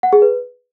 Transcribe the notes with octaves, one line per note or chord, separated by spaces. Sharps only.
F#5
G#4
B4